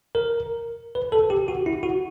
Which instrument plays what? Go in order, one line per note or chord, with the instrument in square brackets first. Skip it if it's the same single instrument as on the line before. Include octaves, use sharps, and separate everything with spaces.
[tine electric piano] A#4
B4
A4
G4
F#4
E4
F#4